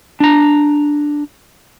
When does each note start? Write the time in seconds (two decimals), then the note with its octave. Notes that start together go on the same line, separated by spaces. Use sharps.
0.20 D4 A#5